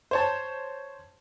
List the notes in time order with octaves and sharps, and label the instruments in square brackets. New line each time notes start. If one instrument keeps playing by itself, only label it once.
[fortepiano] C5 C#5 A5